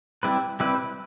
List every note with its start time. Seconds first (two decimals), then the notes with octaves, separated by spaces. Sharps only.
0.23 G3 C4 E4 G4 B4
0.60 G3 C4 E4 G4 B4